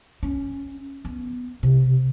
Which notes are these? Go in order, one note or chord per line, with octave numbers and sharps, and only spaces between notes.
C#4
B3
C3